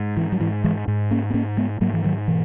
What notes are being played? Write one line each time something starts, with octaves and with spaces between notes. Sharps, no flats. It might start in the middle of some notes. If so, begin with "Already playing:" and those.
Already playing: G#2
E3
F#3
G#2 E3
E3 G#3
G#2
A#3 C#4
B3
G#2 A#3 C#4
G#3 B3
G#2 F#3 A#3
E3
D#3 F#3
B2 E3